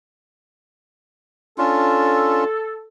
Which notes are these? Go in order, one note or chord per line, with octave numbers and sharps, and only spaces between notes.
C#4 D4 F4 A4